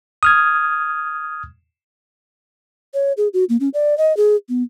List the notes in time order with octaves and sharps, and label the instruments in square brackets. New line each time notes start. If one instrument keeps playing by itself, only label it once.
[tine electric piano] D#6 F6 G#6
[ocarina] C#5
G#4
F#4
A#3
C#4
D5
D#5
G#4
B3